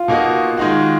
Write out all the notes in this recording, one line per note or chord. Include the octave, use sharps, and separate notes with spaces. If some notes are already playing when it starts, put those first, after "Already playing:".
Already playing: F4
B2 A#3 D#4 F#4
D#3 G#3 D#4 F#4